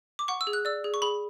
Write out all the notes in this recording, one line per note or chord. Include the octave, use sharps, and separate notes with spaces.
D6
F#5 C#6
E6
G#4
F#6
D5 E6
G#4
C#6
G#4 B5